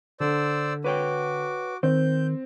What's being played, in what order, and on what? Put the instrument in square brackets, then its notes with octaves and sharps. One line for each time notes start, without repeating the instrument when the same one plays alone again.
[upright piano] D3 [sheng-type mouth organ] C5 D5 E6
[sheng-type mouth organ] F#4 D6 [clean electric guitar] B4 C#5 G5
[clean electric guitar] D#3 [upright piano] C4 [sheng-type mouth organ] G6